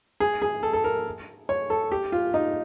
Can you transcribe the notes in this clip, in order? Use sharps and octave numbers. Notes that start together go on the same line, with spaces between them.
G#4
G#4
A4
A4
A#4
C#5
A4
G4
F4
D#4